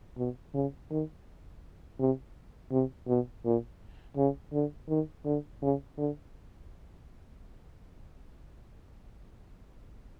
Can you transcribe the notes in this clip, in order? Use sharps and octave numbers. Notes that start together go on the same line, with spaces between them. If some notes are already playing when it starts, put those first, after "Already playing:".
B2
C#3
D#3
C3
C3
B2
A#2
C#3
D3
D#3
D3
C#3
D3